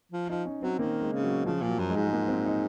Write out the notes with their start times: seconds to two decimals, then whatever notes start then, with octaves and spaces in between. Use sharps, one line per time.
0.12 F3
0.29 F3 D#4
0.46 C#4
0.62 F#3 C4
0.79 D#3 A#3
1.02 G#3
1.13 C#3
1.24 F#3
1.45 C#3 F3
1.62 A#2
1.68 F#3
1.79 F#2
1.90 G#3
1.96 G#2
2.07 G#3
2.13 A#3
2.28 C4
2.46 D#4